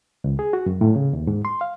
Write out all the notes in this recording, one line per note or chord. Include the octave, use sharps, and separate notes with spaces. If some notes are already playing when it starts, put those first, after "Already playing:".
C#2
G#4
F#4
F#2
A2
C#3
D#2
G#2
C6
F5